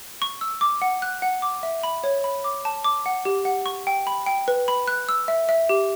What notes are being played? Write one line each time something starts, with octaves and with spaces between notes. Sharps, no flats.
C#6
E6
D6
F#5
F#6
F#5
D6
E5
B5
C#5
B5
D6
A5
D6
F#5
G4
F#5
C#6
G5
B5
G5
B4
B5
F#6
E6
E5
E5
G4